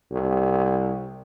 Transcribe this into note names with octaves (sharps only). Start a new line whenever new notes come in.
C2